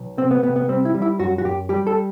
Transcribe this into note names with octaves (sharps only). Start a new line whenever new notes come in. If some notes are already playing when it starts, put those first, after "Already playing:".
Already playing: B1
C3 C4
B3
C3 B3
B3
G3 C4
E4
G3
E4
F#2 F#4
F#4
F#2 G4
G3 G4
A4